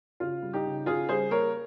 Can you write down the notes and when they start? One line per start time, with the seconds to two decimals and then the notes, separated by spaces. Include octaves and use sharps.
0.20 C#3 F4
0.42 G3
0.53 D#4 G4
0.65 C#3
0.86 C#3 F4 G#4
1.09 G3 G#4 C5
1.30 A#3 A#4 C#5